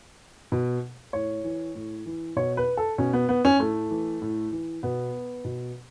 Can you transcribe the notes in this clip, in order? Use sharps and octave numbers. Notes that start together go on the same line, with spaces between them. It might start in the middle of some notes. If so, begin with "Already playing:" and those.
B2
A2 C#5
E3
A2
E3
B2 C#5
B4
A4
B2 C#4
B3
B3
C#4
A2 A3
E3
A2
E3
B2 B3
B2